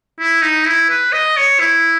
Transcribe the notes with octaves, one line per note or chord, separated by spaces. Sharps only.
E4
D#4
E4
B4
D#5
C#5
E4